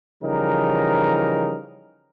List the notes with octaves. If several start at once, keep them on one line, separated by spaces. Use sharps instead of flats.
C#3 E3 F3 G3 D#4 A#4